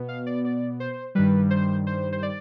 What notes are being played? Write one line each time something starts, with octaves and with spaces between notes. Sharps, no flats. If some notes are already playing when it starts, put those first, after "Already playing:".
Already playing: B2 B3
F5
D5
D5
C5
G2 D#3 G3 B4
C5
C5
C5
D5